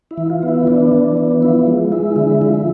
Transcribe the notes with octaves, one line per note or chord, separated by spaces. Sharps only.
E4
E3
F4
B3
E4
E3 D4
E3
B3
F3 E4
G#3
G#3 E4
D3 E4
F3
E4